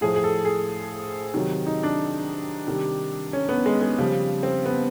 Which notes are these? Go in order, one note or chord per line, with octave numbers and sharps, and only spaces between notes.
A2 F3 G#4
G#4
A4
G#4
C3 D#3 F#3
D#4
D4
C3 D#3 G3
C#4
B3
G#3
G#3
C#3 F3 G3
C4
B3